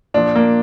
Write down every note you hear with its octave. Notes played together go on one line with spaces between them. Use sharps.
A#2 F3 D4
A#3